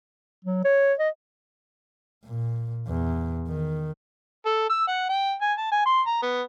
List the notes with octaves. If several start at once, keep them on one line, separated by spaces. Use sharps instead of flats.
F#3
C#5
D#5
A#2
E2
D#3
A4
E6
F#5
G5
G#5
A5
G#5
C6
A#5
B3